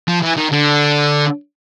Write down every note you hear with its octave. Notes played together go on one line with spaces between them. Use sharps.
F3
E3
D#3
D3